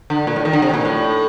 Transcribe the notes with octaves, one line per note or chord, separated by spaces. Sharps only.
D3
A#2
A2
D#3
D3
C3
A#2
A2